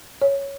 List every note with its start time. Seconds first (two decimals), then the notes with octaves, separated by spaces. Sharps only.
0.22 C#5